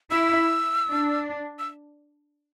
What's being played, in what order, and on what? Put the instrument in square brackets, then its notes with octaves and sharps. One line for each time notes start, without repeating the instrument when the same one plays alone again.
[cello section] E4 [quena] E6
[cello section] D4
[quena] E6